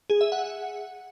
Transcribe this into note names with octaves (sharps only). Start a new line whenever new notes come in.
G#4
E5
F#5